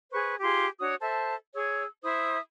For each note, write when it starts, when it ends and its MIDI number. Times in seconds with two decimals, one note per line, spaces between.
0.12 0.35 68
0.12 0.35 71
0.12 0.35 72
0.12 0.35 85
0.42 0.66 65
0.42 0.66 67
0.42 0.66 68
0.42 0.66 84
0.79 0.95 62
0.79 0.95 66
0.79 0.95 73
0.79 0.95 87
1.00 1.35 69
1.00 1.35 72
1.00 1.35 76
1.00 1.35 81
1.54 1.84 68
1.54 1.84 73
1.54 1.84 88
2.03 2.37 64
2.03 2.37 72
2.03 2.37 76
2.03 2.37 87